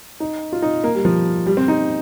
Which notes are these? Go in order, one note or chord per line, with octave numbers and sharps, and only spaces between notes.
D#4
F4
D#4
A#3
G3
F3
G3
C4
D#4